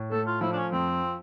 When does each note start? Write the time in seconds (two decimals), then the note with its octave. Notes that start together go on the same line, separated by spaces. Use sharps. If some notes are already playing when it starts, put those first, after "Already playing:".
Already playing: A2
0.11 A3 A4
0.27 F4
0.41 F3 E4
0.53 D4
0.56 C#4
0.72 F2 C4